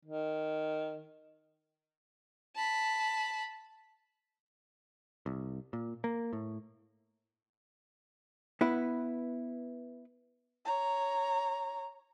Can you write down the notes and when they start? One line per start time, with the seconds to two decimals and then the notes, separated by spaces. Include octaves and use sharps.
0.05 D#3
2.56 A5 B5
5.26 C2
5.73 A#2
6.04 A#3
6.33 A2
8.61 B3 E4 B4
10.65 C#5 A#5